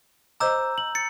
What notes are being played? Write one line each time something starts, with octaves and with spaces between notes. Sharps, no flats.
C5 D#5 A#5 D6 E6 G6
F#7
A6 C#7